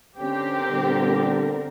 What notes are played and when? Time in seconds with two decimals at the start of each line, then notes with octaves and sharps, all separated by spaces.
0.19 D3 C4 C#4 G4 A#4
0.70 A#2 D3 G3